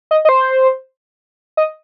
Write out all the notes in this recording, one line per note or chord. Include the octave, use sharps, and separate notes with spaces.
D#5
D#5
C5
D#5